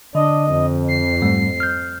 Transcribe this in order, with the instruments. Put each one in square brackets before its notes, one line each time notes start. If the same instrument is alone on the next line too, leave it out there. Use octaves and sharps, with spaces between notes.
[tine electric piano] D3 [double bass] D4 [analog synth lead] D#5
[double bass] F2
[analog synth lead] C7
[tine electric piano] G#2 G3 A3
F6 G6